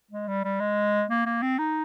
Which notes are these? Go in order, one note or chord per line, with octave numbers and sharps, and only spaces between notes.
G#3
G3
G3
G#3
A#3
A#3
C4
D#4